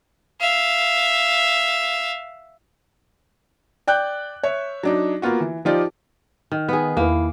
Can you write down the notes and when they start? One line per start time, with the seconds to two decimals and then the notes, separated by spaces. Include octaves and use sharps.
0.41 E5 F5
3.87 D5 G5 F#6 G6
4.43 C#5 E5
4.83 F#3 D4 D#4
5.22 A#3 B3 F4 F#4
5.40 E3
5.65 F3 D#4 F4 G4 D5
6.52 D#3
6.69 D#3 B3 G#4
6.97 E2 A#3 E4 B4